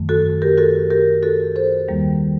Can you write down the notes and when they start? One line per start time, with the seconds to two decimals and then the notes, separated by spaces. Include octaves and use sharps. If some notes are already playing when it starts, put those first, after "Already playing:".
Already playing: F#2 D#3 F#3 A3
0.09 F#4 A4
0.42 G4 A#4
0.57 F#4 A4
0.91 G4 A#4
1.23 F#4 A4
1.56 A4 C5
1.88 D#2 D#3 G3 A#3